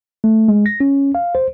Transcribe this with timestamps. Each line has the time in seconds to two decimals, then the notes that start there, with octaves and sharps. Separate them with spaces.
0.24 A3
0.48 G#3
0.66 A#6
0.80 C#4
1.15 F5
1.35 C5